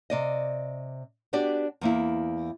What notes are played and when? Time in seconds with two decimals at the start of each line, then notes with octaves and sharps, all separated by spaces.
0.10 C3 D5 D#5
1.33 B3 D4 F#4 G4 D5
1.81 E2 A#3 E4